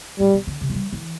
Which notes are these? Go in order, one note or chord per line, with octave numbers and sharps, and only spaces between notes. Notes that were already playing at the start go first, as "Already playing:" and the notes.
A2 G3
B2
D3
C3
A3
G3
E3